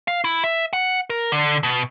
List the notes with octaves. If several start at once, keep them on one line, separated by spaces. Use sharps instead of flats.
F5
E4
E5
F#5
A#4
D3
B2